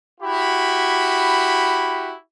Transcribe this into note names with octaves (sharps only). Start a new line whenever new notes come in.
E4 F#4 G4 B5